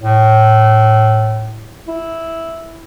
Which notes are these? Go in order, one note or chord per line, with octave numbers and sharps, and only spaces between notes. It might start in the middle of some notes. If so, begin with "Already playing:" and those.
A2
E4